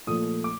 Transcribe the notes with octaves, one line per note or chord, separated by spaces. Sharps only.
A#2 F3 A3 D#6
D6